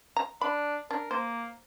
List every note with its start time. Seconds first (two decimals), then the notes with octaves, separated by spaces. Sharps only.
0.17 A#5
0.41 D4 B5
0.91 D4 A#4
1.11 A#3 C5